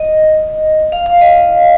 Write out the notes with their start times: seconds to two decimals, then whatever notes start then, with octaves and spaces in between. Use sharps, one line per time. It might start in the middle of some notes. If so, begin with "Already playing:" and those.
Already playing: D#5
0.92 F5
1.06 F5
1.21 D#5
1.36 D#5